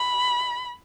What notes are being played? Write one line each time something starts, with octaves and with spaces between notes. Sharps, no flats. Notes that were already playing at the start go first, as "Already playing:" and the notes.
Already playing: B5